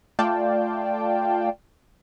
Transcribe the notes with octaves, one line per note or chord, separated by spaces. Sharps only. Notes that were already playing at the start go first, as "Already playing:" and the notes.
A3 F4 D5 F5 G5 A5